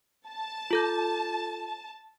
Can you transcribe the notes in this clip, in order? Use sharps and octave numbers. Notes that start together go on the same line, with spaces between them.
A5
F4 A4 G6